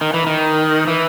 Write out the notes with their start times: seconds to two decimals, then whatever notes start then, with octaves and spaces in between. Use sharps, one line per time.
0.01 D#3
0.14 E3
0.27 D#3
0.88 E3